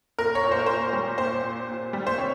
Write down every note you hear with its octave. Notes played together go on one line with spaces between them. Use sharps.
A#2 A#4
C#5
A#2
C5
A#4
A#2 C5
G3
A#2 C5
A#2
A#2
G3
C5
C3 C#5